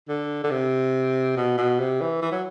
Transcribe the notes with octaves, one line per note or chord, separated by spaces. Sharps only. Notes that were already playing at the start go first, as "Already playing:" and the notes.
D3
D3
C3
B2
B2
C3
E3
E3
F#3